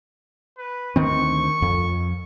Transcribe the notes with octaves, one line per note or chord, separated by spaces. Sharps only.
B4
D2 D#3 C4 C#6
F2